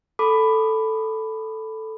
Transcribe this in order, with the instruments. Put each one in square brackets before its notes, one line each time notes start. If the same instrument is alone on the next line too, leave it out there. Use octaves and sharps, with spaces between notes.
[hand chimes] A4 B5 D6